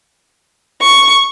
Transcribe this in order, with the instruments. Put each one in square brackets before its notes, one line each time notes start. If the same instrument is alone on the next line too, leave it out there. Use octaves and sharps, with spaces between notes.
[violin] C#6